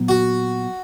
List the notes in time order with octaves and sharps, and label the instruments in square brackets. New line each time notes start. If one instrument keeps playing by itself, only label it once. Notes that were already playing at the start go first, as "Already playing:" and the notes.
Already playing: [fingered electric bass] A#2 F#3 B3
[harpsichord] F#4